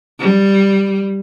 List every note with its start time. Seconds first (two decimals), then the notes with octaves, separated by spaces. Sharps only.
0.19 G3